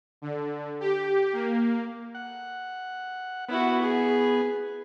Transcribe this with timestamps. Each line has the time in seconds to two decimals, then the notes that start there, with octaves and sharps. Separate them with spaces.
0.22 D3
0.80 G4
1.33 A#3
2.15 F#5
3.49 B3 E4 F#4
3.82 G#4